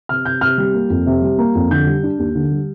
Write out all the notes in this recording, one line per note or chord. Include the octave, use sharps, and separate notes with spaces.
C3 F6
C3 G6
C3 F6
G3
A#3
F2
C3
G3
A#3
F2
D3 G6
G3
D4
D#2
D3
G3